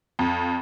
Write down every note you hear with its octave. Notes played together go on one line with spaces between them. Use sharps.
F2